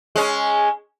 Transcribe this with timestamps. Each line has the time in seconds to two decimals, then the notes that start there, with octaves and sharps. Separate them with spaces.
0.16 G#3 C#4